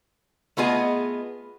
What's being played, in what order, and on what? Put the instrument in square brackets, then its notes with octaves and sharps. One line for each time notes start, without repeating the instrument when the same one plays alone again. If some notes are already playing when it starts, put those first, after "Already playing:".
[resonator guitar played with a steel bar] A3 B3 F4 G#4 D#5